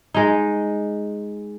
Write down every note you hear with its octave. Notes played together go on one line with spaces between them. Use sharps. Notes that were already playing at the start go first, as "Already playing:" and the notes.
G#3 D#4